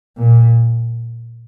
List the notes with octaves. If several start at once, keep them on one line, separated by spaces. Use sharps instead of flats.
A#2